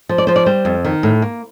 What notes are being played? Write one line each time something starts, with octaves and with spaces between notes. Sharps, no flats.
F3
D5
F3 C5
D5
G3 C5
F2
D#3
A2
A#3